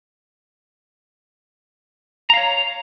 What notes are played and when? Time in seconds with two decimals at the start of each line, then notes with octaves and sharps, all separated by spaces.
2.30 A#5
2.34 F5
2.37 C#5